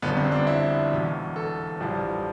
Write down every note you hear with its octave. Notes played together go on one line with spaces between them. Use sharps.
G1 F2 D3 B3
C4
D4
E4
E1 E2 B2
A4
A1 G2 F3